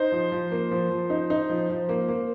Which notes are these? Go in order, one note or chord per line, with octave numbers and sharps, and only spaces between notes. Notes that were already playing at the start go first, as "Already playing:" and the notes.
Already playing: D#4 C5
F3
F3
A#3
F3
F3
D#4
D#4
F3
F3
A#3
A#3